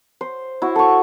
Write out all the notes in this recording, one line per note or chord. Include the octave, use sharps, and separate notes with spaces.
C5
E4 F#4
A4 C#6